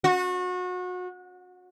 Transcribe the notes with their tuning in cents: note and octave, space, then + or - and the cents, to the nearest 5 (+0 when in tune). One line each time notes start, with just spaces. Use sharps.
F#4 -30